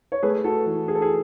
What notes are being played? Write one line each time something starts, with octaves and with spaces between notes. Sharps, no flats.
C#5
A3 G#4 B4
F#4 A4
E3
G#4
A4
G#4